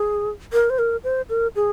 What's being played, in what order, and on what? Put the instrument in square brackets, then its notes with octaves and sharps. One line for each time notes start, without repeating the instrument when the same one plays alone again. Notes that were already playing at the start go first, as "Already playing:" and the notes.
Already playing: [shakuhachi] G#4
A#4
C5
A#4
C5
A#4
G#4